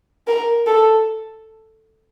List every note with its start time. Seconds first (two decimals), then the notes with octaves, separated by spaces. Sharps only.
0.27 A#4
0.66 A4